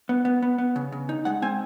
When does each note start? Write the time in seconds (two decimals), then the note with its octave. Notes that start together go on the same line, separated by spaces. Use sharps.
0.09 B3
0.25 B3
0.42 B3
0.58 B3
0.76 C#3
0.92 C#3
1.09 D#4
1.25 G#3 F#5
1.42 C4 G#5